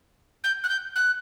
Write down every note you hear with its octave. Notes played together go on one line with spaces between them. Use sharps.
G6
F#6
G6
F#6